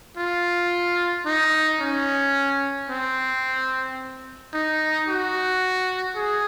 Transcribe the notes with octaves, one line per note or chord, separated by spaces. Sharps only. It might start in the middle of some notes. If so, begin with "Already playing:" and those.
F4
D#4
C#4
C4
D#4
F#4
G#4